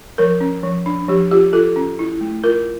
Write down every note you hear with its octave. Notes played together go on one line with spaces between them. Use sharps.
F3 A#4
C#4
F3
D4
F3 G4
F4 G4
F4 A4
C#4
E4
A3
F4 A#4